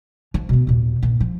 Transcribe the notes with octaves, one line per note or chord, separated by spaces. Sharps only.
F3
B2 B3
D#2 A#2
G2 A#2
F3